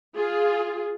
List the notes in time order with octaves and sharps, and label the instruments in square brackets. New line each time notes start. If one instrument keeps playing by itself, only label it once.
[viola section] F4 G#4